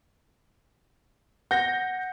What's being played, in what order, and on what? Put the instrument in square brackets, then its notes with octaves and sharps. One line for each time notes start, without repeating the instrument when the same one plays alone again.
[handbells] F#5 [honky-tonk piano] G6 A#6